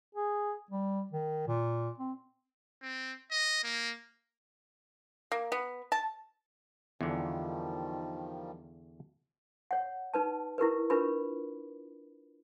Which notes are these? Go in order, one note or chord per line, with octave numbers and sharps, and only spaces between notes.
G#4
G3
D#3
A#2
C4
C4
D#5
A#3
A#3
B3
A5
E2 D3 D#3 F3 G3
C#5 F#5
D#4 B4 A5
E4 G4 A#4 B4
D4 F4 G4 A#4 B4 B5